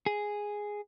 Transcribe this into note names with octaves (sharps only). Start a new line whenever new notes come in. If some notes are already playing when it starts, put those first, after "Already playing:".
G#4